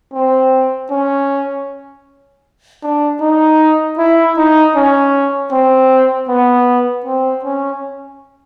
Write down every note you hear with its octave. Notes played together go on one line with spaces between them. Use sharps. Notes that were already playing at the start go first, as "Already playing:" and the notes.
C4
C#4
D4
D#4
E4
D#4
C#4
C4
B3
C4
C#4